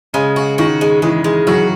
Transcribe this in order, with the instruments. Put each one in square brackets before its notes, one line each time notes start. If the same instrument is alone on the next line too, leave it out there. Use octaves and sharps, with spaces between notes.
[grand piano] C#3 [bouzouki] G#3
[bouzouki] F#4
[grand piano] D#3 [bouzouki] F#4
[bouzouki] G#3
[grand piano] E3 [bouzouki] G#3
[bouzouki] G#3
[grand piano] F#3 [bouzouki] F#4